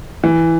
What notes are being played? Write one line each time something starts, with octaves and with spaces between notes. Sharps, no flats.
E3